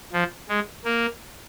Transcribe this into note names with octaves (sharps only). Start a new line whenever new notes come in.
F3
G#3
A#3